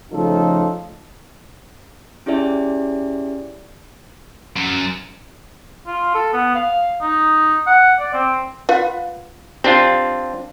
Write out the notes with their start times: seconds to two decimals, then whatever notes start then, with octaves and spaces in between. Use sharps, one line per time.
0.12 C#3 F3 A3 D#4 F4 A4
2.26 C#4 E4 G4 G#4 D5 E5
4.56 F#2
5.87 F4
6.15 A4
6.33 B3
6.55 F5
7.02 D#4
7.67 F#5
8.00 D5
8.13 C4
8.69 F4 B4 F#5
9.64 C4 D4 F4 G4